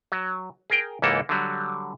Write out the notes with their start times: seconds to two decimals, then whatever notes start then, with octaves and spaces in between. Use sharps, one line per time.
0.12 F#3
0.70 G#4 A#4 G5
1.02 C#2 G#2 E3 A#3 A4
1.29 D3 F#3 G3